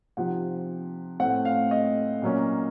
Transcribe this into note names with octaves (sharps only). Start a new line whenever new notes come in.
C3 F3 C4 D#4 F#5
A2 A3 C4 F#5
F5
D#5
A#2 F#3 A#3 C#4